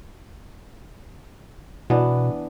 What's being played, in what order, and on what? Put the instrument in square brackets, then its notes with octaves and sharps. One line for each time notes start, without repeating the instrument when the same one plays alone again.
[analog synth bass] B2 [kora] E3 B3 D4